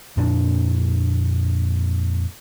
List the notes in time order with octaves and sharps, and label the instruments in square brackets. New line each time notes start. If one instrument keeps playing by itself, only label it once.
[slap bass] F2 A#2 A#3 D4